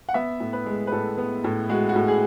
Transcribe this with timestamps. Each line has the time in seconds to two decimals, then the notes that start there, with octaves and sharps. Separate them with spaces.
0.09 F#5
0.14 B3 E5
0.40 A2
0.53 B4
0.66 G#3
0.87 B4
0.92 A2 A4
1.18 B3
1.44 A2
1.69 G#3 F#4
1.89 F#4
1.96 A2
2.08 G#4